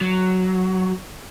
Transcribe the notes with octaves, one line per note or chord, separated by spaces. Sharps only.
F#3